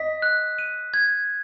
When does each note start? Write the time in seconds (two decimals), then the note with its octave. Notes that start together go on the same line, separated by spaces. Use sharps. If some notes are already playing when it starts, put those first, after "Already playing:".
Already playing: D#5 B6
0.22 F#6
0.59 D#7
0.94 G#6